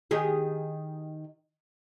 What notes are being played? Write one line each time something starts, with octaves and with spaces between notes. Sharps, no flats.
D#3 G4 G#4